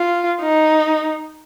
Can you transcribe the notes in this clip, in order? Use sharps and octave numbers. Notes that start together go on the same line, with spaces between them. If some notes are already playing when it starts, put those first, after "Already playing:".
Already playing: F4
D#4